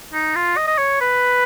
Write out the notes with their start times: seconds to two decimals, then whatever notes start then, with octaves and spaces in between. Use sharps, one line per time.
0.13 D#4
0.35 F4
0.57 D#5
0.67 D#5
0.78 C#5
1.01 B4